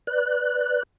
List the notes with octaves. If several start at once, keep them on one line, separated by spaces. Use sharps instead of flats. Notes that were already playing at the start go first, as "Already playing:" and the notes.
B4 D5 F#6